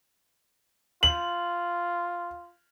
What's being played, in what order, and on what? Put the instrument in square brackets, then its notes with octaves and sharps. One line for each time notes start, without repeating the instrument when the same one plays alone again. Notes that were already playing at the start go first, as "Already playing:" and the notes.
[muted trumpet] F4 [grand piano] F#7